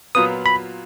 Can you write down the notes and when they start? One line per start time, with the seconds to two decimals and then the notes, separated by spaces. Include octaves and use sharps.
0.15 A#2 F#3 B3 F4 B4 D#6
0.46 B5